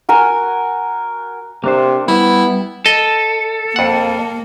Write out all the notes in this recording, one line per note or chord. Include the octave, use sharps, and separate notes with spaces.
F#4 A#4 G#5
C3 A#3 D4 C5
G3 B3 E4
A4 D#5
F2 A#3 F#5